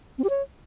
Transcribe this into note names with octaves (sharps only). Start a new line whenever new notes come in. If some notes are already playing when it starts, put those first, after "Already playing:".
C4
G4
C#5